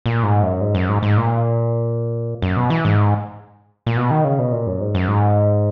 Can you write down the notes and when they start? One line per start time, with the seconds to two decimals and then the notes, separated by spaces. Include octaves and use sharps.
0.06 A#2
0.23 G#2
0.43 F#2
0.61 G#2
0.75 F#2
0.89 G#2
1.03 G#2
1.17 A#2
2.42 F#2
2.57 B2
2.70 E3
2.85 G#2
3.87 A#2
3.97 B2
4.11 D#3
4.24 C#3
4.39 B2
4.52 A#2
4.67 F#2
4.80 G#2
4.95 F#2
5.08 G#2